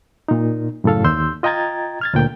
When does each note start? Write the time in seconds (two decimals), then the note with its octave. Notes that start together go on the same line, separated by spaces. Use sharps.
0.28 A#2 D#4
0.84 F#2 A2 C#3 A4 F5
1.04 D#2 C6 E6 G6
1.43 F4 D#5 G5 A#5 G#6 A6
2.01 F6 G#6 A6
2.13 D2 A#2 G5